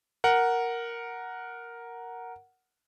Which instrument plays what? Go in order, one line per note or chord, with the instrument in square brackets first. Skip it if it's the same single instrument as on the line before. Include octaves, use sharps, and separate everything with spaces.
[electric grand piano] A#4 F#5